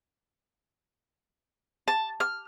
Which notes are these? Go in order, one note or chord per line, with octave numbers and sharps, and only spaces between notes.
A5
F6